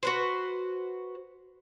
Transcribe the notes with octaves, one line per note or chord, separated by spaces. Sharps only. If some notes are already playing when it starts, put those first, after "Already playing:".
F#4 B4 C5